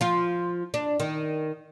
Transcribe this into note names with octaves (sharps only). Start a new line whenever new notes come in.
F3 F4
D4
D#3